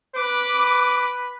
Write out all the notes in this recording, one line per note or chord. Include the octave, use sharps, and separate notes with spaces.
B4 D6